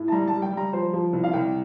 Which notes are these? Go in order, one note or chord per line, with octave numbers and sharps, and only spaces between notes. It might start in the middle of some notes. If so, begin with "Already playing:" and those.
Already playing: A2
A5
G3 A#5
A5
G3
G5
G3 A#5
F3 C5
F3
C2
F5
C2 G5